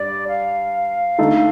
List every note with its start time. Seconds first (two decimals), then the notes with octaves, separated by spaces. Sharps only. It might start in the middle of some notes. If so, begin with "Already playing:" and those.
Already playing: G2 D5
0.28 F5
1.19 D3 A3 D#4 A4